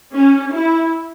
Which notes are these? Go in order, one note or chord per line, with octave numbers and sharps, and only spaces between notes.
C#4
E4